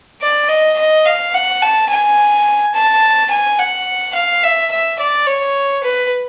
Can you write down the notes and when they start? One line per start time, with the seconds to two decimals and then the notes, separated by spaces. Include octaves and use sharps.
0.22 D5
0.49 D#5
0.78 D#5
1.05 F5
1.34 F#5
1.62 A5
1.89 G#5
2.74 A5
3.30 G#5
3.59 F#5
4.15 F5
4.43 E5
4.71 E5
5.00 D5
5.27 C#5
5.84 B4